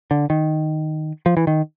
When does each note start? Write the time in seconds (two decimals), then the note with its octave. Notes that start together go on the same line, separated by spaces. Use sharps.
0.11 D3
0.30 D#3
1.26 F3
1.37 E3
1.47 D#3